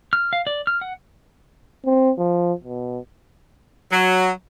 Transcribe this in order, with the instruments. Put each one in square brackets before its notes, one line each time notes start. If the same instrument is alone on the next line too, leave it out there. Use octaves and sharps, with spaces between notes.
[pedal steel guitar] F6
F5
D5
F6
F#5
[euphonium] C4
F3
B2
[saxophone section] F#3